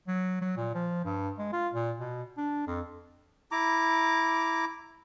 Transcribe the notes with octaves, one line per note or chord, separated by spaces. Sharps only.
F#3
F#3
A#2
F3
G2
G#3
F4
A#2
B2
D4
F2
E4 A#5 D6